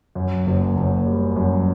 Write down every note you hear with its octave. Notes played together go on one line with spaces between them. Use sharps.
F#2
F#1
F#1
G3
F#2